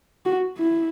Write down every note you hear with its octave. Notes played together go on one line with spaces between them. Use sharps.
F#4
E4